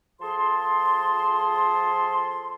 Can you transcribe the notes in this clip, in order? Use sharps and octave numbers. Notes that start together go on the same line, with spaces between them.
F3 G#4 A4 A5 C6